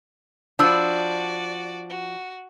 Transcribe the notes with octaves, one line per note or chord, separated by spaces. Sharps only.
F3 D4 F#4 D5 B5 E6
F#4